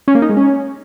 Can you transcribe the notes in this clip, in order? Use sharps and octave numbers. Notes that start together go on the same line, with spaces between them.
C#4
A#3
D#4
G#3
C#4